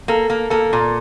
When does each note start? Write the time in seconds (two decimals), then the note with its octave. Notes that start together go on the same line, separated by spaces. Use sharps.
0.08 A#3 A4
0.30 A#3
0.50 A#3 A4
0.73 A#2